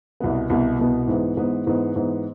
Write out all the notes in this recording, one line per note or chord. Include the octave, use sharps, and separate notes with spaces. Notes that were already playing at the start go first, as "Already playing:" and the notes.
C2 B2 B3
C2 B2 B3
C2 B2 B3
G#2 E3 B3
G#2 E3 B3
G#2 E3 B3
G#2 E3 B3